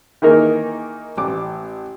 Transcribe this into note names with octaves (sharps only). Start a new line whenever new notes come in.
D#3 E3 A#3 D#4 G#4 A#4
A1 D6